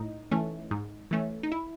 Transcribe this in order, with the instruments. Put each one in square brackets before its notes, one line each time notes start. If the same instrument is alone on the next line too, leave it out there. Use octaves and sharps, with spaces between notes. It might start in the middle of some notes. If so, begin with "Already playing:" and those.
Already playing: [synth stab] A2 D#4
E3 A3 C#4
G#2
E3 A3 C#4
D#4
E4